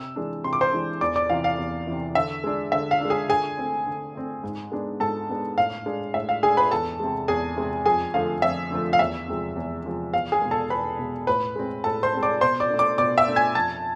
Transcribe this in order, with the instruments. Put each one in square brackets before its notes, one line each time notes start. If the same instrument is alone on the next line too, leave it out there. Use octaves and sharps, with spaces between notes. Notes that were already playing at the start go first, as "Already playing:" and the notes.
Already playing: [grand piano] C3 E6
E3 G#3 D4
C3 C6
D6
C5 C6
E3 G#3 D4
E2 D5 D6
D5 D6
C3 E3 F5
F5
E2
C3 E3
D3 E5
G#3 D4
D3 E5
F5
G#3 D4
G#4 G#5
D3 G#4 G#5
A3 C4
D3
A3 C4
G#2
G#3 B3 D4
G#2 A4 A5
G#3 B3 D4
A2 F5
G#3 D4
A2 E5
F5
G#3 D4 G#4 G#5
B4 B5
E2 A4 A5
C3 G#3
E2 G#4 G#5
C3 G#3
F2 G#4 G#5
D3 F3 A3 F5
F2 E5
D3 F3 A3
F5
E2 E5
C3 F3 G#3
E2
C3 F3 G#3
E2 F5
G#4 G#5
B2 G#3
A4 A5
E2 B4 B5
B2 G#3
A2 B4 B5
G#3 C4
A2 A4 A5
C5 C6
G#3 C4
D5 D6
B2 C5 C6
D5 D6
A3 D4
D5 D6
B2 D5 D6
E5 E6
A3 D4
G#5 G#6
F2 A5 A6